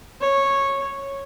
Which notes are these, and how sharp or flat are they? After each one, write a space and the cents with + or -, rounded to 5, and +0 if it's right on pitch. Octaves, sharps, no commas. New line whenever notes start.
C#5 -10